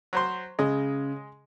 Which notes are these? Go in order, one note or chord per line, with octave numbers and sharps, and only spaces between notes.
F#3 C5 C6
C#3 G#3 D#5